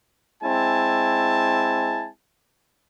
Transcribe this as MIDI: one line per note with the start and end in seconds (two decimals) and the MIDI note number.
0.42 2.08 56
0.42 2.08 60
0.42 2.08 64
0.42 2.08 80
0.42 2.08 81